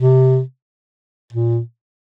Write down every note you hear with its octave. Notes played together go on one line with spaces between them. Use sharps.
C3
A#2